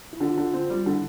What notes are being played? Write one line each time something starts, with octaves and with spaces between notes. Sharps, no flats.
E4
D3 F4
D3
C4
G3
D3 E4